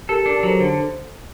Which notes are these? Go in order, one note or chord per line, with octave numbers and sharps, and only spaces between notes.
G4 A4 A#4
D4 G4 A#4
F#3 A4 C5
D3